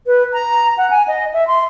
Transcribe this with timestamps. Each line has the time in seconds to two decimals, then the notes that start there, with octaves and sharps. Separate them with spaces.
0.07 B4
0.33 A#5
0.78 F#5
0.90 G#5
1.08 D#5
1.33 E5
1.47 C6